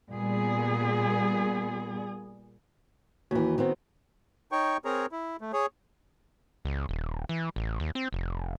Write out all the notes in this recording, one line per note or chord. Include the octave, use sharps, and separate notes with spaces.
A#2 G3 B3 G#4
D#2 E3 F#4
D#3 B3 C4
D#4 C#5 G5 C#6
C4 G#4 A#4 C#5 A#5
E4
A3
G#4 C#5
C#2
D#1
E3
A1
D#2
C4
F1